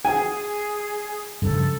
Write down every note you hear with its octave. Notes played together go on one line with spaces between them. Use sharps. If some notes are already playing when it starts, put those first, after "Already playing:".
G#4 G#5
G2 C#3 F3 A4